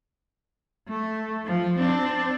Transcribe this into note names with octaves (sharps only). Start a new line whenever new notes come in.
A3
F3
C4 D4